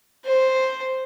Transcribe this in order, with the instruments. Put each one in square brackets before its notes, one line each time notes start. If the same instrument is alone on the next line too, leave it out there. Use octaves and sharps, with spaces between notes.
[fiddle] C5